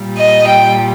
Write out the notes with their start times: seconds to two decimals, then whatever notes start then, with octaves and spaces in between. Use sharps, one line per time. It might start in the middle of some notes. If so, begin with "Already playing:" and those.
Already playing: A#2 G3
0.17 D#5
0.46 G5